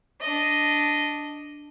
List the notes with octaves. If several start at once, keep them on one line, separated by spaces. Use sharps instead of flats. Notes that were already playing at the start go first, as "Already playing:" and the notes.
D4 D#5